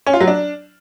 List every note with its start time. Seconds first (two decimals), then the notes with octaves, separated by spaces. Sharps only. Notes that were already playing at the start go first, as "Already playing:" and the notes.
0.06 C#4
0.13 F4
0.20 F#3
0.27 D4